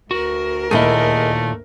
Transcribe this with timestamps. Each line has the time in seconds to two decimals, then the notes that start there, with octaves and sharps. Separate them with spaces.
0.11 D2 F#4 A#4
0.71 D#2 A#2 A3 E4 G#4 D#5